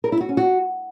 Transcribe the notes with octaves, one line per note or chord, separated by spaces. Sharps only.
A#4
E4
F#4
C#4
F#4